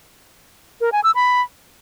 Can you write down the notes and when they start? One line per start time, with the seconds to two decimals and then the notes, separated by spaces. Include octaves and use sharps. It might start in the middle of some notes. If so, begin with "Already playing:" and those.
0.81 A#4
0.92 G#5
1.04 E6
1.15 B5